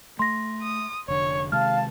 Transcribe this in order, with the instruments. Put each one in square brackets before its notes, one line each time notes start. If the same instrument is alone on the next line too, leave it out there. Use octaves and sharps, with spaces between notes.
[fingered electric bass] A3 [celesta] C6 A#6
[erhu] D#6
[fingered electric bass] F1 D3 [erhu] C#5
[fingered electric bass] C3 D#3 G#3 [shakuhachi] F5 [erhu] A5 [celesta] F6